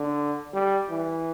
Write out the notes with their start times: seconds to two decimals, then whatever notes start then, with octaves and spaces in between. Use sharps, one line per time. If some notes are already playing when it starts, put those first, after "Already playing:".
Already playing: D3
0.53 G3
0.89 E3